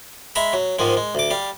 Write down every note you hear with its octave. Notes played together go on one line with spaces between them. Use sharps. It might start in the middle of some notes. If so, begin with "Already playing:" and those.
G#3 E5 A#5 B5
F#3
G#2 D#3 F3 G#3
G#3
D2 D6
G3 F5